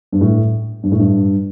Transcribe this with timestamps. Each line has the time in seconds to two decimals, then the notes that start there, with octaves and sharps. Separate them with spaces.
0.12 G2
0.21 A2
0.83 G2
0.92 A2
0.99 G2